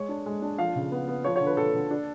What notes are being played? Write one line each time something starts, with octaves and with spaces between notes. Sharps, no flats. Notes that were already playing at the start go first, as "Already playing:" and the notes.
Already playing: G#3 C#5
D4
G#3
D4
F3 F5
C#3
B3
B3
F3 C#5
C#5
D3
B4
D3 A4
D3
D4